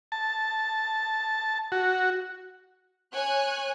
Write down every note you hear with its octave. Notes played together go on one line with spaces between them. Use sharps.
A5
F#4
C#5 G#5 F#6